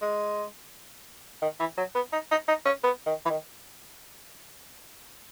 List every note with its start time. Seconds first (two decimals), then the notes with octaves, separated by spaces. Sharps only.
0.02 G#3
1.42 D#3
1.60 E3
1.78 F#3
1.95 B3
2.12 D#4
2.31 D#4
2.48 D#4
2.66 C#4
2.83 B3
3.06 D#3
3.25 E3
3.30 D#3